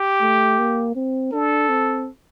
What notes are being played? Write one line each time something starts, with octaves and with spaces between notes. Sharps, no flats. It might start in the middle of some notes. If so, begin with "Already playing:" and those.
Already playing: G4
A3
A#3
C4
D4 A4
C4